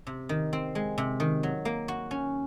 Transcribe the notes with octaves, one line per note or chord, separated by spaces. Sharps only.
C3
D#3
C4
G#3
C3
D#3
F#3
A#3
F#4
C#4